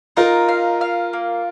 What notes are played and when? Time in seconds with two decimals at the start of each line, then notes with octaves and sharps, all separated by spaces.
0.17 D#4 F4 A#4
0.49 F5
0.81 F5
1.13 A#3